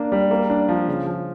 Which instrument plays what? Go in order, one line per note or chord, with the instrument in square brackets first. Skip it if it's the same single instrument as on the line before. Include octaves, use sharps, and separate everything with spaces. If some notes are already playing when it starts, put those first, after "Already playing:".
Already playing: [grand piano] A#3 D4
G3
A#3
D4
F3
C#3
F3